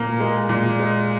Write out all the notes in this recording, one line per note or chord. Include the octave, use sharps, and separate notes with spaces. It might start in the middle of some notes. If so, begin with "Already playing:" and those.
Already playing: A#2 A#3
G#3
A#2
G#3